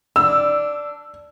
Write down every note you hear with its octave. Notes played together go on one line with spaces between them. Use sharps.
D4 E6